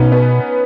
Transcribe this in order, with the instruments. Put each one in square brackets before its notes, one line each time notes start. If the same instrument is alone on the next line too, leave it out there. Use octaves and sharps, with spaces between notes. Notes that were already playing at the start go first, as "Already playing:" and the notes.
Already playing: [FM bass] B2 [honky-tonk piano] B3 C#4 D#4
[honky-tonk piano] B3